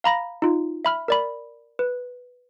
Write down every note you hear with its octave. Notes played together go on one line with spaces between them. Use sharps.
F5 A#5 B5 A#6
D#4 F4
E5 B5 F6
A#4 D5 B5
B4